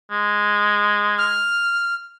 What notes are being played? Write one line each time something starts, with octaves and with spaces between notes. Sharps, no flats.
G#3
F6